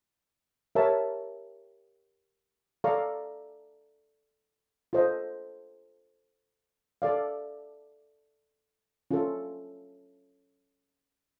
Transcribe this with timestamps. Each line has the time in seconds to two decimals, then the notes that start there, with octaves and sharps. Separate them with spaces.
0.75 G4 A#4 C#5 E5 A5
2.84 A4 D5 F5 A#5 C#6
4.93 F4 A4 C5 D#5
7.02 A4 D5 F5
9.11 C#4 F4 A4